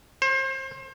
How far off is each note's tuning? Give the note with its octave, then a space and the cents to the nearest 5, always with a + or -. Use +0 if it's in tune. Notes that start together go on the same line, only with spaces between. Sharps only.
C5 +30